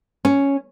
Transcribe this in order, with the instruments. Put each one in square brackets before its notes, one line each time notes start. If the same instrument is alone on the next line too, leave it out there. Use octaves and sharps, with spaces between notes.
[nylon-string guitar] C#4